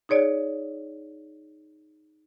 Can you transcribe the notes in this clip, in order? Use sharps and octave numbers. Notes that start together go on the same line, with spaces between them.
D#4 G#4 C#5 D5